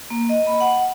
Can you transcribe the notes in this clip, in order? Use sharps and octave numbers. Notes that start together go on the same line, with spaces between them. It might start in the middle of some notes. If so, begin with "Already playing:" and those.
A#3
D#5
B5
F#5